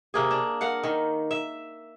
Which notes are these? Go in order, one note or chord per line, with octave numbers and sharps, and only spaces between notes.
C3 A#3 G#4
D4
A#4 F5 F#5
D#3
E5